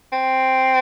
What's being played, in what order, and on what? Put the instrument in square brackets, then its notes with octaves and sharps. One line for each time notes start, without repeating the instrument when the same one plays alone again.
[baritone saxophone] C4